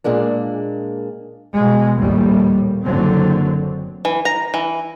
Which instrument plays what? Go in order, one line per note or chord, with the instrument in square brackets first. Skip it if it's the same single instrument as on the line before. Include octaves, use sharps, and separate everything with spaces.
[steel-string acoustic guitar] A#2 G#3 A#3 D4
[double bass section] B2 G#3
A#1 D#2 A2 G3
F#1 D3 F#3 C4
[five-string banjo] E3
A#5
E3